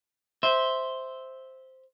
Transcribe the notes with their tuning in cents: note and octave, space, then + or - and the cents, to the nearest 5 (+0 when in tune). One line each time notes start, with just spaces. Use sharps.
C5 +0 E5 -15